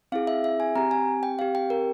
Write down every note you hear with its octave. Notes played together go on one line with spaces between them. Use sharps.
C4 E4 G#4 F5
E5
E5
G#5
C4 G4 A#5
G#5
G5
C4 G4 F5
G5
A#4